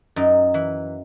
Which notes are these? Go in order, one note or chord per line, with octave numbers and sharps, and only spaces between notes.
F#2 D#4
E3